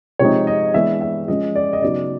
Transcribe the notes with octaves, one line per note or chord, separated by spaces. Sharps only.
C3 F3 G#3 C4 D#4 C#5
D#5
E3 G#3 B3 D4 E5
E5
F3 G#3 C#4 D#5
D5
D#5
C#3 F#3 B3 D#4 D5